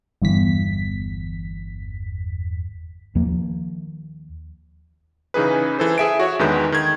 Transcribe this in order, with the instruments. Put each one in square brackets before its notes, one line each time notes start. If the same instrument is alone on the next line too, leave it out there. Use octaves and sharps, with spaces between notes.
[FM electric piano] G1 E2 B6
[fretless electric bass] D#2 F3 A#3
[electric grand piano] C#3 E3 D#4 G#4 B4
E3 A4 C5
G#4 E5 D7
F#4 C#5 E5
E2 D3 D#3 G#3 B4 G6
D#3 G#6